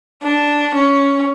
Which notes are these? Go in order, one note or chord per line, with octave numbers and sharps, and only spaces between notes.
D4
C#4